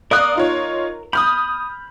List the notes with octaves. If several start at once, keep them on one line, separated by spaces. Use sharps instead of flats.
A#4 D5 F5 D#6 F#6
D#4 F4 C#5
B5 D#6 F6 G6